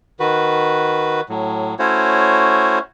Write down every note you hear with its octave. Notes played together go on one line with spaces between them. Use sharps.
D#3 F#4 B4
A2 F#3
A3 C#4 E4 F#4 C5 C#5